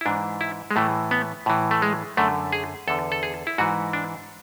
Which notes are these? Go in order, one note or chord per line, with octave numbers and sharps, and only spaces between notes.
E4
G#2 E3 D4
E4
G#3
A2 E3 A3
B3
A2 E3
A3
G#3
F#2 D3 A3
G#4
E2 D3 A4
A4
G#4
E4
G#2 E3 F#4
D4